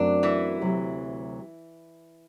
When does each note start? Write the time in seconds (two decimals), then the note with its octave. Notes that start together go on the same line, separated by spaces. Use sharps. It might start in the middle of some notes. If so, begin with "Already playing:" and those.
Already playing: F#2 F#3 A3 C4 D4 F#4
0.23 E3 E4
0.61 D2 C3 F#3 C4